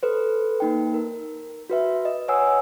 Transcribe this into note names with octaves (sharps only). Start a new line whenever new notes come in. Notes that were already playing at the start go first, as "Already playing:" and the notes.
A4 B4 C5
A#3 D#4 G5
A#4
F#4 B4 E5
D#5
B4 C#5 F#5 G#5 D#6 E6